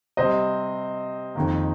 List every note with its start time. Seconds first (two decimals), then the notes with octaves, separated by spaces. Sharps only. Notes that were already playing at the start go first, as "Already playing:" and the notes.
0.17 C3 G3 C4 C5 D#5
1.35 F2 D#3 A#3